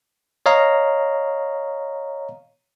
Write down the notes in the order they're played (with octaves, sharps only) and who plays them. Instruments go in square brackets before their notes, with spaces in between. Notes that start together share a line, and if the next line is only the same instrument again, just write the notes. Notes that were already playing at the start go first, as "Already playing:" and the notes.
[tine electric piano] C#5 D#5 F5 A#5